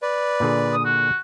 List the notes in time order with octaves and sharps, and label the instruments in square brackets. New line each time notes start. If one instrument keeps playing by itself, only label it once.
[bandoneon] B4 D5
[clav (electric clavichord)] A#2 D3 G#4
[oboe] D#6
F#4